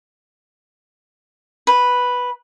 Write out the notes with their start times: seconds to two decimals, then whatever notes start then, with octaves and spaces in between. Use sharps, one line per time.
1.67 B4